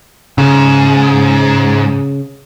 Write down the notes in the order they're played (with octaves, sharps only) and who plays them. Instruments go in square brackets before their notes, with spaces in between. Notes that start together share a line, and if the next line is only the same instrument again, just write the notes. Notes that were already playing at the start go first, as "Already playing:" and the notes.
[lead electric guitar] G#2 [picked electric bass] C#3